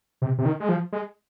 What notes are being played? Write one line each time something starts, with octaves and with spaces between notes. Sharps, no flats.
C3
C3
D#3
G#3
F3
G#3